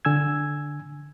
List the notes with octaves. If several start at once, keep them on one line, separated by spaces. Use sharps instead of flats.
D3 G#5 E6 G#6